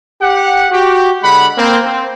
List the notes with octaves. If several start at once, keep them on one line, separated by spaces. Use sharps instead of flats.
G4 F#5
F#4 G4
D3 G#3 F#5 B5
A#3 C4
C4